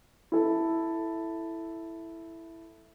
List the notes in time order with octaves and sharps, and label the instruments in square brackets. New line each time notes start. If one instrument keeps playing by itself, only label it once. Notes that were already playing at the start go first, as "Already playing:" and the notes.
[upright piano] E4 A4